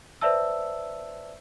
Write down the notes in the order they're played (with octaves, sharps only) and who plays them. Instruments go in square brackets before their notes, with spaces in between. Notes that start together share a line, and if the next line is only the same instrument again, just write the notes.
[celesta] B4 C5 D5 E5 A5 E6